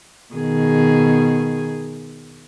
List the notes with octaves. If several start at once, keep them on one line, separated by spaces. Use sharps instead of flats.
B2 D#3 G#4